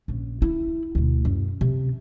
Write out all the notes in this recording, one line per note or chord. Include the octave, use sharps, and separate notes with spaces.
A#1 C#3
E4
D2 B2
F#2
C3